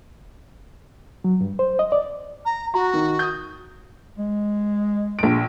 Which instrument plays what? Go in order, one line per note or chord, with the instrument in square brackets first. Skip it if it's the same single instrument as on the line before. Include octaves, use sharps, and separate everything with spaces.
[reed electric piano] F#3
G2
C5
D#5
D5
[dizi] A#5
[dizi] F#4 [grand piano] A#5
[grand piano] D#3
D#6 G6
[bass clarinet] G#3
[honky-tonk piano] A#1 D7